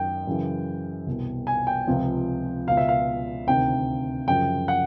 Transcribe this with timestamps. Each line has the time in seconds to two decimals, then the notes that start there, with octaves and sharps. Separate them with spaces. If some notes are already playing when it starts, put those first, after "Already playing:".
Already playing: F#2 D#3 G5
0.27 F#2 C#3 E3
1.06 C2 B2
1.47 G#5
1.67 G5
1.87 C#2 C3 F3
2.67 C#2 B2 F5
2.77 E5
2.89 F5
3.47 D2 C3 D#3 G5
4.28 F#2 C#3 F3 G5
4.68 F#5